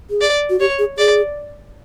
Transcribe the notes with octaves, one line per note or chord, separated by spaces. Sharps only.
G#4
D5
F#4
G4 C#5
G#4
G#4 D5